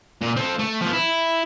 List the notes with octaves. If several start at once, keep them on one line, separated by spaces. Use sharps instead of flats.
A#2
C4 A4
A3
F3 B3
E4